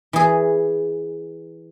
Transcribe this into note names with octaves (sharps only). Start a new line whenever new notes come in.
E3 G#4